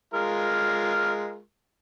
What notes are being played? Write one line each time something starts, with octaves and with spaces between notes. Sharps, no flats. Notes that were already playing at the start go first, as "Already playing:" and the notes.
G#3 F4 A#4